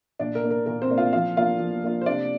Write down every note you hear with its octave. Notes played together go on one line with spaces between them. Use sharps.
A#2 D4 D5
A#4
A#3 D4
A#4
A#2 A#4
C4 C5
A#3 D4
F4 F5
F3 F4 F5
A#3 D4 F4 F5
F3
A#3 D4 F4
C5
C3 D4 D5